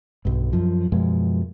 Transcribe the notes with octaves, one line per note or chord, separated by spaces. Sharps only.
B1 G2
F#2 F3
F#2 B2 F3 G#3